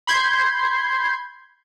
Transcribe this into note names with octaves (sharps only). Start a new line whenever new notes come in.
B5 C6 G6 G#6 C7